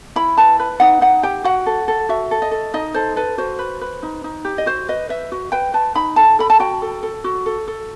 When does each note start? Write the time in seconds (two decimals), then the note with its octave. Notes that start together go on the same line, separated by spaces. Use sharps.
0.16 E4 B5
0.37 B4 A5
0.59 B4
0.80 D#4 F#5
1.01 D#4 F#5
1.23 G4 G5
1.44 F#4 F#5
1.66 A4
1.88 A4
2.09 F#4 E5
2.31 A4
2.42 D#5
2.51 A4
2.74 D#4 D#5
2.94 A4 C5
3.16 A4 B4
3.38 F#4 C5
3.59 B4
3.81 B4
4.03 D#4
4.24 D#4
4.45 G4
4.58 D#5
4.66 F#4 C5
4.89 B4 D#5
5.09 B4 E5
5.32 F#4
5.52 B4 G5
5.74 B4 A5
5.95 D#4 B5
6.16 A4 A5
6.39 A4 B5
6.50 A5
6.60 F#4 G5
6.82 A4
7.03 A4
7.24 F#4
7.46 A4
7.68 A4